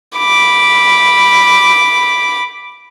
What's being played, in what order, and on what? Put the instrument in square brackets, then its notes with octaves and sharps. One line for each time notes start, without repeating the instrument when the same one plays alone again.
[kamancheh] B5 D6